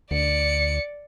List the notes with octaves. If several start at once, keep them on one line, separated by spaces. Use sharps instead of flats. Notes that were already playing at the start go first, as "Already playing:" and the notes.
D2 D5 C#7